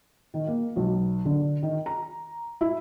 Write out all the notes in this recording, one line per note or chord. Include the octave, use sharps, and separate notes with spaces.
D#3
A#3
B1
D3
D#3
A#5
E4